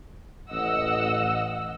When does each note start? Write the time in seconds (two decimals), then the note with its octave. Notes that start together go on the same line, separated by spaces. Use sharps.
0.51 A1 D#5 F#5 E6